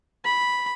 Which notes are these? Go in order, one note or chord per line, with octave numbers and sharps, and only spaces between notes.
B5